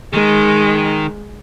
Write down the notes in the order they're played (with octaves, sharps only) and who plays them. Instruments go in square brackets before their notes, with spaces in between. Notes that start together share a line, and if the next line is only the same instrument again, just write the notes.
[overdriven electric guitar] D#3 [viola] G#3